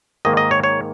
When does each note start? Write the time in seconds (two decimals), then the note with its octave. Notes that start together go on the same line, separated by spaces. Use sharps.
0.25 G#2 D#3 A#3 D#5
0.37 D#5
0.51 C#5
0.64 C#5